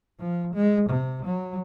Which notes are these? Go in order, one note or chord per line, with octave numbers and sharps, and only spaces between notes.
F3
G#3
C3
F#3